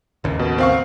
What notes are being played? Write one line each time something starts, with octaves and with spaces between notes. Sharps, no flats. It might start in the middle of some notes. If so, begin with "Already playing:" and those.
A1 D#2 C#3
B2
C4 F5 C#6